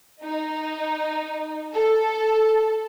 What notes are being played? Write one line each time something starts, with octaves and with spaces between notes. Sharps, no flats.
D#4
A4